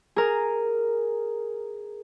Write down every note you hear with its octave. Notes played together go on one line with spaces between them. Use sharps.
G#4 A#4